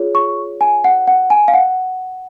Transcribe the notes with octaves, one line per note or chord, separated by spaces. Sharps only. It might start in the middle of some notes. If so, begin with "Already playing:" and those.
Already playing: F4 G#4 C#5
C#6
G#5
F#5
F#5
G#5
F5
F#5